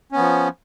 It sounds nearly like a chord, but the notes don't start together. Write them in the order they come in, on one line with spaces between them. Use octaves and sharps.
C#4 B3 F3